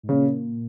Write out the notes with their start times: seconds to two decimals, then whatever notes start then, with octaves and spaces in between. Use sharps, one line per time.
0.03 G#2
0.09 A#2 C#3